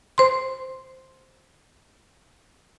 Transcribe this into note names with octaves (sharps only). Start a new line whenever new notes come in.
C5 C6